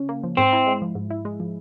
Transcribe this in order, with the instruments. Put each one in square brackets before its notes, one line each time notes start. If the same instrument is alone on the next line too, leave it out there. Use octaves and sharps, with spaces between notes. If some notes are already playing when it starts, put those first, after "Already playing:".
Already playing: [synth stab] C#3 C#4
A#3
F3
[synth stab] G#2 [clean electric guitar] C4
[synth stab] E4
G#3
F3
G#2
E4
G#3
F3